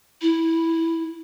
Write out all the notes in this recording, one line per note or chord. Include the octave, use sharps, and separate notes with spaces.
E4